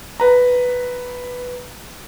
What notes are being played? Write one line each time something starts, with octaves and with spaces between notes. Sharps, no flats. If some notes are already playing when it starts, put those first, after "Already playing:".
B4 A#5